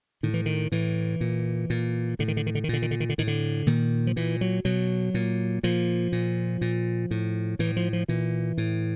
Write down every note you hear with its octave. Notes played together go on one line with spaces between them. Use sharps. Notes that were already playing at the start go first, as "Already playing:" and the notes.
A2 D#3
E3
D#3
A2 E3
A#2
A#2
A2 D3
D#3
D3
D#3
D3
D#3
A#2 D3
D#3
D3
D#3
D3
A2 D#3
D3
A#2 D#3
F3
A#2 E3
F#3
B2 F#3
A#2
A#2 F3
A#2
A#2
A2
A2 E3
F3
F3
A#2 E3
A2